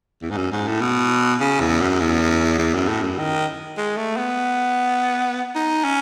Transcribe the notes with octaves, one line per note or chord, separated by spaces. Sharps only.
E2
G#2
F#2
G#2
A2
B2
C#3
E2
F#2
E2
E2
F#2
A2
F#2
D#3
G#3
A3
B3
D#4
C#4